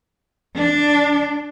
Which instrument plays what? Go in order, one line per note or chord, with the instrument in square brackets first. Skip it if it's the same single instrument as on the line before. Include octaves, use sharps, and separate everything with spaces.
[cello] D4